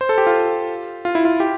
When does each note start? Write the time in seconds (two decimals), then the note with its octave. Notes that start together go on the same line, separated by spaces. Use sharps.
0.01 C5
0.09 A4
0.18 G4
0.27 F4
1.05 F4
1.15 E4
1.25 F4
1.40 G4